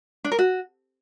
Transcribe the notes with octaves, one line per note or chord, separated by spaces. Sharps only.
D4
A#4
F#4